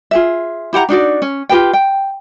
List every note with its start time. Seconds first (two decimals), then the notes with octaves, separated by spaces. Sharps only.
0.11 F4 G#4 E5
0.73 E4 G4 F#5 A#5
0.89 D4 D#4 F#4 D5
1.22 C#4
1.49 F4 G4 B4 G5
1.73 G5